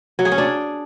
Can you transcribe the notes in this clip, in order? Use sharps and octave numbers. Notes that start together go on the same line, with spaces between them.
F#3
G#4
C#4
D4